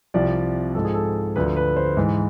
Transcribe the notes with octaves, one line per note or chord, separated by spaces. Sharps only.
C2 C3 F3 D5
G#2 F3 A4
G#4
A4
D2 D3 F3 B4
B4
C5
G#2 E3